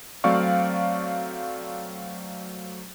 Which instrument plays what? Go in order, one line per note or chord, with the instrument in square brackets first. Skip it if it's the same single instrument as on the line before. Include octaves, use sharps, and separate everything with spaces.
[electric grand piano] F#3 A3 C4 D5 F5 C#6